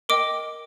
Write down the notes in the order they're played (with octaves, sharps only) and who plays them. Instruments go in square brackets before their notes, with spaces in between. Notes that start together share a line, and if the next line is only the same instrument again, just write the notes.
[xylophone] A#4 D#5 G5 D6 D7